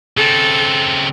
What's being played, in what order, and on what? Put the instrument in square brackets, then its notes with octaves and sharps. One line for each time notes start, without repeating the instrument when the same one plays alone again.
[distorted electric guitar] C#3 C4 [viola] A4